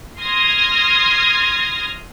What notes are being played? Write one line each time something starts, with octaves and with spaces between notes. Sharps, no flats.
C6 D#6 F6 G#6 A#6